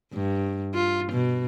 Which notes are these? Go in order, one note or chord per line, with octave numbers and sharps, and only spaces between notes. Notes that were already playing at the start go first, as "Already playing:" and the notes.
G2
F4
B2